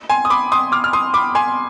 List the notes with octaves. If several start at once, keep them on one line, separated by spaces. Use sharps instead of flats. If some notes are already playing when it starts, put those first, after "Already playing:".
G#5 C6
D#6
B5 D6
C6 D#6
D6 F6
F6
C6 D#6
B5 D6
G#5 C6